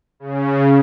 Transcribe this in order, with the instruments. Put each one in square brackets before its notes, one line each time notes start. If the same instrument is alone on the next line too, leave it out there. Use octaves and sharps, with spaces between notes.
[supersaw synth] C#3